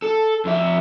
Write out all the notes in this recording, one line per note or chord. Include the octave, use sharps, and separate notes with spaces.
A4
F2 E5